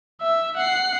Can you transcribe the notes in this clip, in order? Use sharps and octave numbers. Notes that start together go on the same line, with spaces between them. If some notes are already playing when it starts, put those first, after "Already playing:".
E5
F#5 C7